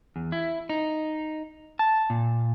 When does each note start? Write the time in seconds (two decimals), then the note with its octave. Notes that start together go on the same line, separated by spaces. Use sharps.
0.16 E2
0.32 E4
0.69 D#4
1.79 A5
2.10 A#2